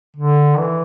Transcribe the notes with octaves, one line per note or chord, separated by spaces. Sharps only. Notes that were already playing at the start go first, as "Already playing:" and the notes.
D3
E3